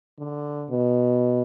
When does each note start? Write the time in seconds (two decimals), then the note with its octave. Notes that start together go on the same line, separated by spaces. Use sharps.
0.19 D3
0.70 B2